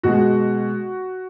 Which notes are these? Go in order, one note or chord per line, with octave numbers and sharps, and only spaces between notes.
B2 G#3 F#4